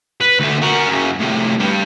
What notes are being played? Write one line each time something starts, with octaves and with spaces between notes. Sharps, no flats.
B4
D2 A3
F#4 A#4
F#2 C#3
A2 C3
G2 G3